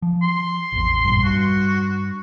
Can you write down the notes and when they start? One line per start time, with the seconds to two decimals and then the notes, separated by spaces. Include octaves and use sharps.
0.02 F3
0.22 C6
0.72 A1 E2
1.05 F1 A#1 G2
1.24 G2 F#4